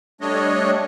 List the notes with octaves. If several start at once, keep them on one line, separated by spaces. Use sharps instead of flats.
G3 A3 D4 C#5 D#5